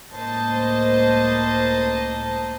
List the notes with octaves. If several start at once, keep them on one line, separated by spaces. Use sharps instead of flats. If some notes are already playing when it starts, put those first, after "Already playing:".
C#2 A2 A#3 C5 D#5 A5